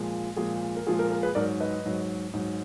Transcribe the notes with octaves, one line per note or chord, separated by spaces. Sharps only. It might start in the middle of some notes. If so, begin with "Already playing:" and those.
Already playing: A#2 F3 G#3
A#2 F3 G#3 G#4
A#4
A#2 F3 G#3 G#4
A#4
A#4
G#4 B4
G#2 F#3 A#4 D5
B4 D#5
G#2 F#3
G#2 F#3